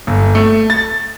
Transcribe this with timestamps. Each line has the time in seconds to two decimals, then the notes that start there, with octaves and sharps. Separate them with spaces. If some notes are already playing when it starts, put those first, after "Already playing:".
0.07 G1
0.35 A3
0.70 A6